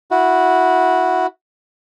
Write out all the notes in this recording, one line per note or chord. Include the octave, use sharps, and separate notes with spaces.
E4 F#4